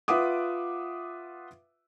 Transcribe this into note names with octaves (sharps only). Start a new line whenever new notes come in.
F4 B4 E5 F#5 D6 D#6